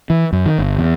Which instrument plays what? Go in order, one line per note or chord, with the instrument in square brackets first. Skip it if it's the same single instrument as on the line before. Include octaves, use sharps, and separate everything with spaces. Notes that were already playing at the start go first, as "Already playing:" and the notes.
[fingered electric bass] E3
F#2
D#3
G1
E2